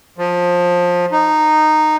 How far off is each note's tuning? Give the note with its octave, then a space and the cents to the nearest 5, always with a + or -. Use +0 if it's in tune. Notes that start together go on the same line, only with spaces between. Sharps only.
F3 +20
D#4 -10